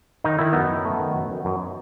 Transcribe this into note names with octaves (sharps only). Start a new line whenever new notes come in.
D#3 D#4
D#3 E4
F#2 B3 D#4
F#2
A3
D#3
F#2
F#2
F#2